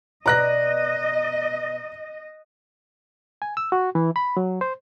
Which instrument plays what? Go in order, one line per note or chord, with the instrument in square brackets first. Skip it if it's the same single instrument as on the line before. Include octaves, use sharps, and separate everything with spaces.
[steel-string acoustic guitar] B2 D5 [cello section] D#5 [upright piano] A#5 F#6 A#6
[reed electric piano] G#5
E6
F#4
E3
B5
F#3
C5